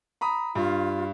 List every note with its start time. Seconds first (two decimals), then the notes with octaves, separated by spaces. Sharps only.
0.21 A#5 B5 D#6
0.55 G2 F4